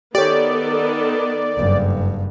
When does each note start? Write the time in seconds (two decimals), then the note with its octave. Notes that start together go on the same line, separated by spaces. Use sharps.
0.15 D#3 B3 G4 A4 C#5 D5
1.56 F#1 G2